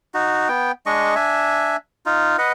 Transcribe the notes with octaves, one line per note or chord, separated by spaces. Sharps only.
D#4 F#4
B3 G5
G#3 D4 D#5 C#6
D4 E5 G#5
D#4 F4
B4 D#5 F#5